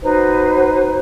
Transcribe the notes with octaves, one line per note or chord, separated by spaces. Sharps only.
D#4 F#4 B4 C5